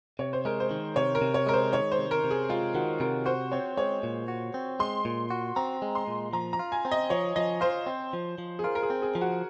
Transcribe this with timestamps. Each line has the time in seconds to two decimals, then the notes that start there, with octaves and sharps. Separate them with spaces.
0.19 C3 C#5
0.33 C5
0.45 G#3 A#4
0.60 C5
0.71 D#3
0.96 C3 C#5
1.15 A#4
1.21 C3
1.34 C#5
1.47 G#3 A#4
1.53 C5
1.72 D#3 C#5
1.92 C5
1.99 C3
2.11 A#4
2.24 C3
2.31 G#4
2.49 G#3 F4
2.75 D#3 F#4
3.00 C3 A#4
3.26 F#4 C5
3.52 C4 C#5
3.77 G#3 C#5
4.03 A#2
4.28 F#4
4.54 C4
4.80 G#3 C6
5.05 A#2
5.30 F#4
5.56 C4 A#5
5.82 G#3
5.95 C6
6.08 A#2
6.33 F3 A#5
6.53 A#5
6.59 F4
6.72 G#5
6.85 C4
6.92 D#5
7.10 F3 C#5
7.36 F3 D#5
7.61 F4 C5
7.86 C4
8.13 F3
8.38 F3
8.59 G#4
8.64 F4 A#4
8.75 A#4
8.83 G#4
8.90 C4
9.02 G#4
9.15 F3
9.21 F#4